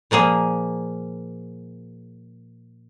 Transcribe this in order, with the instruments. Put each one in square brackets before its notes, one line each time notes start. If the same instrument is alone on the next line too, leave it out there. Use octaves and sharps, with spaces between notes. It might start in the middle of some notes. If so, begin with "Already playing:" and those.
[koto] A#2 F3 A#3 G#4